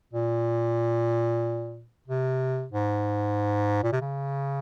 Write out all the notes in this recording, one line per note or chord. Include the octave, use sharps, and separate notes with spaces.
A#2
C3
G#2
A#2
C3
C#3